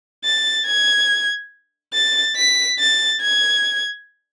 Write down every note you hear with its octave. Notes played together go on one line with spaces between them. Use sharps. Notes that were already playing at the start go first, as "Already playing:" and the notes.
A6
G#6
A6
B6
A6
G#6